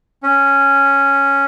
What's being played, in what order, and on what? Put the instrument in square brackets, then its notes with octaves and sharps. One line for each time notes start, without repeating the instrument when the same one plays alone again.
[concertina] C#4